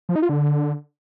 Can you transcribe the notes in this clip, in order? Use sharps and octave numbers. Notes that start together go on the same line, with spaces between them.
F3
D#4
F4
D3